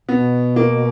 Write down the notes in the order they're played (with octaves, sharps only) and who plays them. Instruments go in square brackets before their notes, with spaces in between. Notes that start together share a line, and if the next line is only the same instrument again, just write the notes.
[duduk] B2 [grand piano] B3
[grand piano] A#3